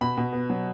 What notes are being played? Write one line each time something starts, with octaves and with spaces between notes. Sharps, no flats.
B2 B5
B2
B3
F#3